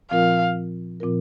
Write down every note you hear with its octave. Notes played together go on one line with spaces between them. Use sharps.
A#2 F3 C4 F4 A#4 F5
A#2 F3 C4 F4 A#4